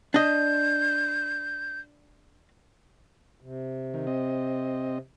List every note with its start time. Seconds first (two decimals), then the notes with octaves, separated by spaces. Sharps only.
0.14 D4 D#5 G6
3.41 C3
3.94 D#3
4.07 C4 D#5